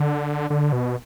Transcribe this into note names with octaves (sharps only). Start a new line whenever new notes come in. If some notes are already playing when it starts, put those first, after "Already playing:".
Already playing: D3
D3
B2